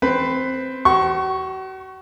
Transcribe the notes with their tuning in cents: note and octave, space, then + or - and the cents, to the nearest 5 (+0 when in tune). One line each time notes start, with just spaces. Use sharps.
C4 +0 B4 +15
F#4 +40 C#6 +0